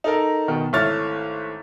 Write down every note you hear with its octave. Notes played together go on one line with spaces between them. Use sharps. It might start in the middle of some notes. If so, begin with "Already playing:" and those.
D#4 A4 A#4
B2 D#3
G#1 A3 E4 C#5 F6 A6